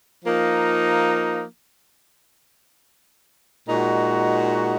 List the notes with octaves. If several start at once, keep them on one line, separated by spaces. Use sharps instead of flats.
F3 A#3 D#4
A#2 G#3 D#4 F#4